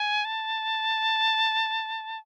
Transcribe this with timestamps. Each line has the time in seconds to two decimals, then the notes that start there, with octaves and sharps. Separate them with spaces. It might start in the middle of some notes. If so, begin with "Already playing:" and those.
Already playing: G#5
0.25 A5